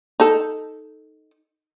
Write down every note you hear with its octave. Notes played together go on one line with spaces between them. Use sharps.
D#4 A4